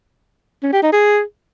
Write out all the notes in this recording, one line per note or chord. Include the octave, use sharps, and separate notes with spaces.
C#4
G4
D#4
G#4